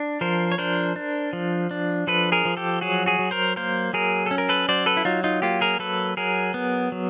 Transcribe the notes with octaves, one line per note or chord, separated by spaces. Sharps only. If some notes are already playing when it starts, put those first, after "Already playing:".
Already playing: D4
F3 A#4 C5
C#5
D4 A#4 C5
D4
F3
D4
F3 A4 B4
G#4 A#4
F3
G4 A4
F#3 F#4 G#4
F#4 G#4
F#3
A#4 C5
A#3 A#4 C5
F#3 G#4 A#4
C#4 A4
A#4
A4 B4
F#3 C5 D5
A4 B4
E4
F#3 D#4 F4
D#4 F4
A#3 F4 G4
G#4 A#4
F#3 A4 B4
F#3 G#4 A#4
B3
F#3